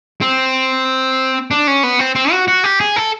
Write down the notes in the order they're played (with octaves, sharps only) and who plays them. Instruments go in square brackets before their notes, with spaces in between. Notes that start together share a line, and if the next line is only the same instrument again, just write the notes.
[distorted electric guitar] C4
D4
C#4
B3
C4
C4
F#4
F#4
G4
G#4
A4